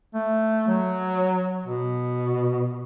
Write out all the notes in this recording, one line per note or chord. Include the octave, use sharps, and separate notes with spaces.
A3
F#3
B2